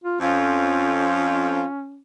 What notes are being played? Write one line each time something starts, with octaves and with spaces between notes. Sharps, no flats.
F4
F2 C#4 F4